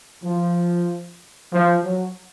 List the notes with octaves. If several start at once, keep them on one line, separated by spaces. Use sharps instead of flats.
F3
F3
F#3